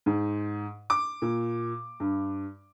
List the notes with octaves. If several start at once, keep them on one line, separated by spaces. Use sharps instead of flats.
G#2
D6
A#2
G2